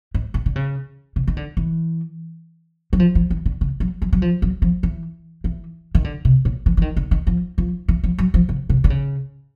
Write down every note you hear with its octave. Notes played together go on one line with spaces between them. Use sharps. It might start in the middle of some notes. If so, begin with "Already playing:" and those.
G#2
A2
D3
C#3
C3
D#3
D3
E3
F#3
F3
F3
E3
D3
C#3
F#3
F#3
F#3
F3
F#3
F3
E3
E3
D#3
D3
C3
A#2
E3
E3
D#3
D3
D#3
F3
F3
E3
F3
F#3
F3
C#3
C3
D3
C#3